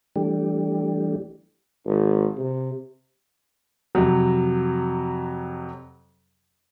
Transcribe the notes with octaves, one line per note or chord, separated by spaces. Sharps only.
E3 G3 A3 D4 G4
G#1
C3
F2 C3 F#3